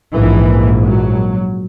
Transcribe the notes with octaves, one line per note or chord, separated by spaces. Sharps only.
A#1 G#2 E3
F#3